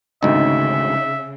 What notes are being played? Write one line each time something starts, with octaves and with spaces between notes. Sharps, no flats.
G#1 D2 C#3 D#4 E5